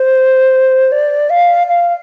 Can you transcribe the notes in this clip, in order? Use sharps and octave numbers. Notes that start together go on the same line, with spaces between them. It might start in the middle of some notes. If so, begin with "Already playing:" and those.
Already playing: C5
D5
F5
F5